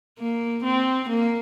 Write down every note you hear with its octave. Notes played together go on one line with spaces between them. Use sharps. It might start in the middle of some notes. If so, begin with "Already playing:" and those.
A#3
C4
A#3